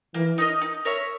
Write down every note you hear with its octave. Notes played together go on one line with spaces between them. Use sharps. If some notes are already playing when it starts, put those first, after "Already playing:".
E3 A#3
D#4 A#4 D#5
D#4
A#4 C#5 E5